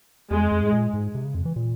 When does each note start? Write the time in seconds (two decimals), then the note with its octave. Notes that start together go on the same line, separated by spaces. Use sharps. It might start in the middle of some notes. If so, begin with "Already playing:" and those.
0.31 E2 G#3
0.41 F2
0.52 F2
0.62 G#2
0.72 A#2
0.94 G#2
1.15 C3
1.25 C#3
1.35 F2
1.45 E3
1.56 A#2